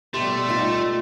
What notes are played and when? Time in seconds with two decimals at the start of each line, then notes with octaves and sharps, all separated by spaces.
0.14 B2 G3 A3 G4 C6
0.49 D#4 F4